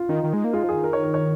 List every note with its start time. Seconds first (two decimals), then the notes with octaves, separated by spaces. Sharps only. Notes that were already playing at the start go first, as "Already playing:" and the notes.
Already playing: F4
0.09 D#3 D#4
0.24 D#3
0.34 G#3
0.44 A#3
0.53 G#3 F4
0.64 F3
0.69 D#3 G#4
0.84 A#4
0.93 C#5
1.03 A#4
1.14 C#5